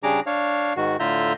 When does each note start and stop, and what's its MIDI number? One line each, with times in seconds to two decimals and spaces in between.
0.03 0.20 49
0.03 0.20 55
0.03 0.20 62
0.03 0.20 68
0.03 0.20 82
0.03 0.20 86
0.26 0.73 62
0.26 0.73 73
0.26 0.73 77
0.77 0.96 44
0.77 0.96 51
0.77 0.96 66
1.00 1.33 45
1.00 1.33 50
1.00 1.33 65
1.00 1.33 76
1.00 1.33 82
1.00 1.33 91